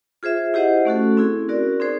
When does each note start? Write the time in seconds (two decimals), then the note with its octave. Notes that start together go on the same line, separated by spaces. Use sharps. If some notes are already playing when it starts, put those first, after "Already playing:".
0.23 F4 G#4 C5 E5
0.54 E4 G4 C5 D#5 F#5
0.85 A3 C#4 F#4 A4
1.17 C4 E4 G#4
1.48 C#4 F#4 A#4 D5
1.80 C4 D#4 G#4 C5